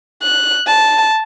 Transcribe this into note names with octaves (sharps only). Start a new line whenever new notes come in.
F#6
A5